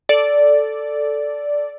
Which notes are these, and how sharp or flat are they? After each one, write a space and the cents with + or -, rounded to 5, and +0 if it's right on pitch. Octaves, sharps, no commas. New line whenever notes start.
A4 +0 D5 -5